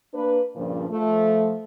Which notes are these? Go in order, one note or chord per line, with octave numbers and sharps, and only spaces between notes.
A#3 D4 B4
G2 A#2 C#3 F3
F3 A3